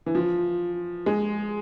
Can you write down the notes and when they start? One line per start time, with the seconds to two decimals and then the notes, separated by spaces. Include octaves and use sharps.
0.06 E3
0.15 F3
1.06 G#3